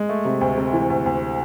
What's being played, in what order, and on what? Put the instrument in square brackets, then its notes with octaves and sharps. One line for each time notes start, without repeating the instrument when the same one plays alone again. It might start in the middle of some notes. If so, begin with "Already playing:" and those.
Already playing: [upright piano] G#3
A3
C3
D2
C3
E3
D2
D2